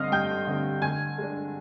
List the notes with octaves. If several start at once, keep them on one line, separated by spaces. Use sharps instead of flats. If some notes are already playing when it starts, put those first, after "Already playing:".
Already playing: G2 D3 G3 C4 D#5 F5 D#6 F6
G2 G5 G6
D3 G3 C4
D3 G#5 G#6
G#3 D4